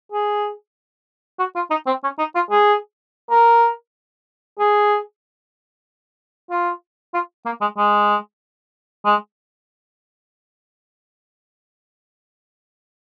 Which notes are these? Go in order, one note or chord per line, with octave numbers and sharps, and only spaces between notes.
G#4
F#4
F4
D#4
C4
C#4
D#4
F4
G#4
A#4
G#4
F4
F4
A#3
G#3
G#3
G#3